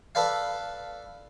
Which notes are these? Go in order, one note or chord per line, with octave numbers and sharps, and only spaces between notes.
A4 B4 D5 F5